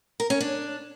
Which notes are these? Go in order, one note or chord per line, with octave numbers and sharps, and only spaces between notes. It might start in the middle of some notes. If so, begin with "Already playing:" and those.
A#4
C#4
D4